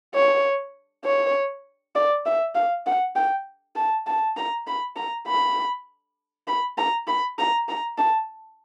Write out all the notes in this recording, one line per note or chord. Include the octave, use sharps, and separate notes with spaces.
C#5
C#5
D5
E5
F5
F#5
G5
A5
A5
A#5
B5
A#5
B5
B5
A#5
B5
A#5
A#5
A5